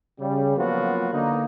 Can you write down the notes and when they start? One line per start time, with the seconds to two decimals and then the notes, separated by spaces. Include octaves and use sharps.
0.19 C#3 G3
0.57 F3 F#3 A#3 B3 F4 F#4
1.13 D3 A#3 D#4